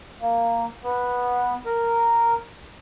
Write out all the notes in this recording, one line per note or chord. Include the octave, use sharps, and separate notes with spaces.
A#3
B3
A#4